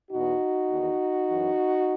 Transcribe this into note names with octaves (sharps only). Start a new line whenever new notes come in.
E2 B2 D#4 F#4
E2 D#3
F#2 E3